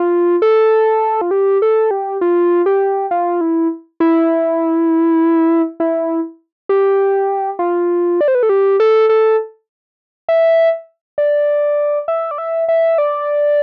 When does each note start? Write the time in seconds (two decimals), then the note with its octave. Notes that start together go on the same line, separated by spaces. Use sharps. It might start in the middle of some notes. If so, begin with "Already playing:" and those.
Already playing: F4
0.42 A4
1.21 F4
1.31 G4
1.62 A4
1.91 G4
2.21 F4
2.66 G4
3.11 F4
3.41 E4
4.00 E4
5.80 E4
6.69 G4
7.59 F4
8.21 D5
8.28 C5
8.35 B4
8.43 A4
8.49 G4
8.80 A4
9.09 A4
10.29 E5
11.18 D5
12.08 E5
12.31 D5
12.38 E5
12.68 E5
12.98 D5